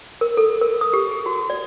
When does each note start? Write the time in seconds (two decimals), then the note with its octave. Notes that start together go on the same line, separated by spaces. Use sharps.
0.21 A#4
0.37 A4
0.62 A#4
0.81 D#6
0.93 G4
1.11 G#4
1.26 F#4
1.50 D5